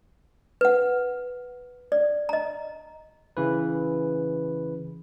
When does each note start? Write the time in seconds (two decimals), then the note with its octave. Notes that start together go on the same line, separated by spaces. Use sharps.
0.61 B4 F#5
1.92 D5
2.29 D#5 A#5
3.37 C#3 E3 B4